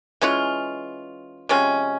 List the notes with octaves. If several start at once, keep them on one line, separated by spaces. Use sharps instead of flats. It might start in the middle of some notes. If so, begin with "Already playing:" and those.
E3 G#3 C#4 F4
C3 F3 G#3 C#4